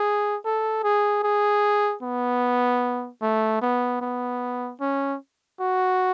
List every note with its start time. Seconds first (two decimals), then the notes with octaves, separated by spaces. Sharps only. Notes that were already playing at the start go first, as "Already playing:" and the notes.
Already playing: G#4
0.45 A4
0.83 G#4
1.23 G#4
2.03 B3
3.22 A3
3.61 B3
4.01 B3
4.81 C#4
5.60 F#4